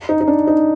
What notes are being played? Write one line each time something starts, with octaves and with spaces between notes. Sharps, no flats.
D#4
D#4
D4
D#4